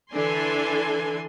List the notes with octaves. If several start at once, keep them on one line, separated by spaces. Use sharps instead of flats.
D3 E3 D4 A4 G#5 C6